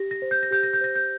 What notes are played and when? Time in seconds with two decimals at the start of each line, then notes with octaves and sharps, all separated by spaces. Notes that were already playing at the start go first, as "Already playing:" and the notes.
Already playing: G4 A#6
0.11 A#6
0.22 C5
0.31 G6
0.43 A#6
0.51 G4 G6
0.63 A#6
0.73 G6
0.81 C5 A#6
0.95 G6